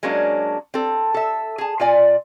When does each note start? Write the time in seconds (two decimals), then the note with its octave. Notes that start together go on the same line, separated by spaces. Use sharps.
0.03 F#3 G#3 A#3 C#4 D4
0.74 C4 A4
1.14 A4 E5
1.58 G#4 A5
1.80 A#2 F4 D5 G#5